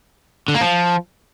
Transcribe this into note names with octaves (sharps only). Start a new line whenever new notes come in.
D3
A#3
F3